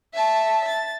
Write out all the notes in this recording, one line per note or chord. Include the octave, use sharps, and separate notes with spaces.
E5 A5
A6